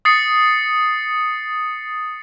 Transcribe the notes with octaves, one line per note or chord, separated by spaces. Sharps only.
D#6 A6 C7 C#7